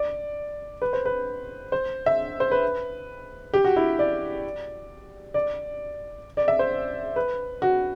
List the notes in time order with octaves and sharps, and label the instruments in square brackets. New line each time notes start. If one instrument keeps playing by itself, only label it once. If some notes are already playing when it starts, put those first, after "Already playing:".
Already playing: [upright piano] D5
B4
C5
B4
C5
E5
C5
B4
G4
F#4
E4
D5
D5
D5
E5
C5
B4
F#4